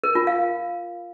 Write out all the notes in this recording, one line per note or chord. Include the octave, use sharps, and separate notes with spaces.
A#4
F4
F5